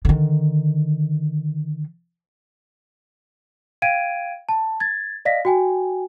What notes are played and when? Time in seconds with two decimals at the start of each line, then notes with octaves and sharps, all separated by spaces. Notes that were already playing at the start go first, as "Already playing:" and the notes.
0.05 D3 D#3
3.82 F5 G5 G#6 D7 D#7
4.49 A5
4.80 G#6 A6
5.25 D5 D#5 F5 A#6 B6
5.45 F#4 G5 G#5